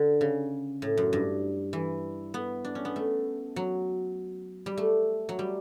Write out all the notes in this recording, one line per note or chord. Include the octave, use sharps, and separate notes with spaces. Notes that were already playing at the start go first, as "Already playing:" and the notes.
Already playing: D3
C#3
A2
F#2
G2
E3
B3
D4
C#4
B3
A3
F#3
G3
A3
F#3
G3